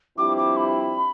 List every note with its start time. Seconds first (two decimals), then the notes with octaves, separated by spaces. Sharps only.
0.18 G2 F3 C4 E4 G4 D6
0.37 D6
0.57 B5